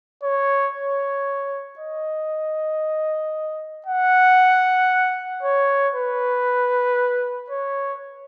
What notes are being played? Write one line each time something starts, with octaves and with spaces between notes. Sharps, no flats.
C#5
C#5
D#5
F#5
C#5
B4
C#5